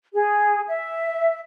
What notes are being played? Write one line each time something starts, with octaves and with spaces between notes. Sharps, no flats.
G#4
E5